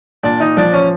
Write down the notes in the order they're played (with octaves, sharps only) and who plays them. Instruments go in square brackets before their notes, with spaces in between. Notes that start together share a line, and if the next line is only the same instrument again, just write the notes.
[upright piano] A#2 [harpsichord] D4
[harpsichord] D#4
[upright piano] F3 [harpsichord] D4
[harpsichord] C#4